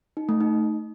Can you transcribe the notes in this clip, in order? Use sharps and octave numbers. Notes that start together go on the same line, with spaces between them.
D#4
A3
D#4